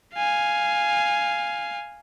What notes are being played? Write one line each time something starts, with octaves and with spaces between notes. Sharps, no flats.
F5 G#5